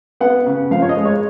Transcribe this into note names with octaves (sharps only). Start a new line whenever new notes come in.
B3 F#5
C#3
F3 F5
C#5
D#5
G#3
C#5